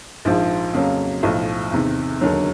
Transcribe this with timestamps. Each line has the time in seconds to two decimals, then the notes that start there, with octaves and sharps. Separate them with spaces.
0.25 A#1 G#2 F3
0.73 F2 C#3 F#3 A#3
1.23 B1 A2 F3
1.72 E2 C3 D#3
2.21 E1 D#2 D3 F#3